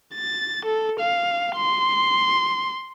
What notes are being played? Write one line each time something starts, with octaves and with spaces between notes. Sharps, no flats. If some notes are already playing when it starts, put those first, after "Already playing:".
A6
A4
F5
C6